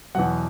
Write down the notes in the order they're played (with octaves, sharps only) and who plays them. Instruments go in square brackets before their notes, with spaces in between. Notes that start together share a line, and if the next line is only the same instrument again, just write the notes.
[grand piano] E2 B2 F#3 F#5